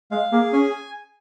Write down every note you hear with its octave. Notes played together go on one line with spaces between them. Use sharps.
G#3 F5
A#3 G#4
C#4 G#5